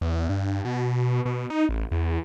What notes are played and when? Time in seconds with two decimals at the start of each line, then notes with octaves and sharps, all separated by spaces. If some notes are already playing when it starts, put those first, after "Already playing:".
0.01 E2
0.29 G2
0.65 B2
1.25 B2
1.50 D#4
1.69 A1
1.91 E2